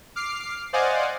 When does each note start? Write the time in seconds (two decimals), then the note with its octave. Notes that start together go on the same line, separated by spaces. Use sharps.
0.15 D6 F6 C7
0.73 C5 D5 D#5 F5 F#5 G#5